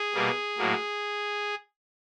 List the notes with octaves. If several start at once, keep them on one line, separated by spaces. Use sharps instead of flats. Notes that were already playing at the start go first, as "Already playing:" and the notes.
Already playing: G#4
B2 G3 A#3
A2 F#3 A#3